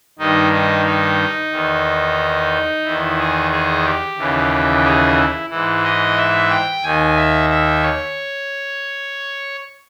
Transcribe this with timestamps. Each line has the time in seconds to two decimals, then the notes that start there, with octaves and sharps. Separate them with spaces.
0.19 G2 D#3 D#4
0.52 D#4
0.86 D#4
1.52 E2 D#3
2.84 E2 D#3 E4
3.18 G#4
3.51 G#4
3.84 G4
4.17 D#2 C#3 E3
4.84 G#4
5.17 E4
5.50 G#2 E3 E4
5.83 D#5
6.17 E5
6.50 G5
6.83 D#2 D#3 G#5
7.16 E5
7.49 E5
7.82 C#5